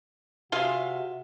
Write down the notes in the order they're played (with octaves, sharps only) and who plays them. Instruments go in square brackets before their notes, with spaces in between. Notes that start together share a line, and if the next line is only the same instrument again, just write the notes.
[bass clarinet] C3 [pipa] F4 G#4 F5 [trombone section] F#4 [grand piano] E5 G#5 G7